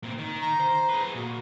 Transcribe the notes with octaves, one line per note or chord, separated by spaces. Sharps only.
A#2 C4
D#3
A#5
C5
G#4 B4
A#2 F#4